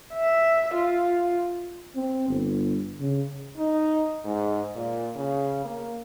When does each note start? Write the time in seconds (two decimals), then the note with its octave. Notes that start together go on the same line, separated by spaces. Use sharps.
0.13 E5
0.74 F4
1.96 C4
2.28 G1
3.00 C#3
3.57 D#4
4.24 G#2
4.75 A#2
5.16 C#3
5.65 A#3